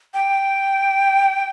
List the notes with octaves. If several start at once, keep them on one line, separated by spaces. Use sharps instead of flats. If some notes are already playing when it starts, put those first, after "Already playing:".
G5